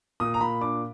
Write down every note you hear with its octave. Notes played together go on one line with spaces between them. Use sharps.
A#2 D#6
A#5
A#2 B5
D4 D6